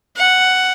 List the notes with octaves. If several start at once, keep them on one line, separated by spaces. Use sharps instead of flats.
F#5